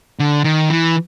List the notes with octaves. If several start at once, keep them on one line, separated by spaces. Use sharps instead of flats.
D3
D#3
E3